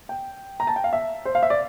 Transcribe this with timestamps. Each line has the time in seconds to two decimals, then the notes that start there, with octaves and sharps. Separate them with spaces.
0.09 G5
0.60 A#5
0.67 A5
0.76 G5
0.84 F5
0.93 E5
1.25 C5
1.35 F5
1.43 E5
1.50 D5